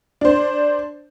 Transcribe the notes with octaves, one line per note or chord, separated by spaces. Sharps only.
D4 C5